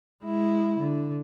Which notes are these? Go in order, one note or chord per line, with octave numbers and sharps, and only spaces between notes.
G#3 E4
D3